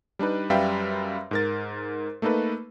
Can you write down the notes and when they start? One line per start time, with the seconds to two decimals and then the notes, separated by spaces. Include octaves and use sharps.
0.19 G3 D4 D#4 B4
0.50 F#2 G3 B4 E5 F5 G5
1.31 G#2 A#4 A6
2.22 A3 A#3 D#4 A4 B4